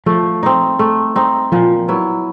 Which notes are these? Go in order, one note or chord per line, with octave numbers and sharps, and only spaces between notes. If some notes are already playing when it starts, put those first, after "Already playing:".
F3 A3
C4 D#4
A3
C4 D#4
A#2 F3
F#3 B3 E4